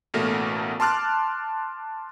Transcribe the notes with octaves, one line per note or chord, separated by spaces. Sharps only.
A1 B2 A3 A#3 A#4
A5 C6 D6 F6 F#6 A6